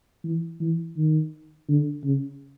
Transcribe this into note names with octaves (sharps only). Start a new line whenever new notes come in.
E3
E3
D#3
D3
C#3